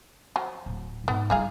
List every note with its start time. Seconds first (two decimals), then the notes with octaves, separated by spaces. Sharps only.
0.36 F3 F#3
0.66 D1
1.08 G#2 B3
1.30 G3 D#4 F4 G#4 F5